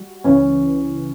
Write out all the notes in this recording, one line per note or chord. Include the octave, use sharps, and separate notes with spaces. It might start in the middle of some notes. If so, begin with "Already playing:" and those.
Already playing: G3 F#4
C#2 C#3 E3 C#4